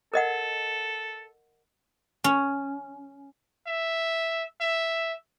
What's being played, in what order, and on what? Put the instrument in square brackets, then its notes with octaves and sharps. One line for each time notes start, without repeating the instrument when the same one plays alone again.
[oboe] A4 [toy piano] A#4 D#5 F#5
[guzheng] C#4
[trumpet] E5
E5